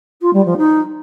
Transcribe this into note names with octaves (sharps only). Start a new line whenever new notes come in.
F4
G3
F3
D#4